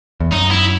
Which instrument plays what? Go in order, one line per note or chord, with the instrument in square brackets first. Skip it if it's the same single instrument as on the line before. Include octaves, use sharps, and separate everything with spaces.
[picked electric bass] E2
[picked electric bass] F#2 [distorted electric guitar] D#4
[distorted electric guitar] E4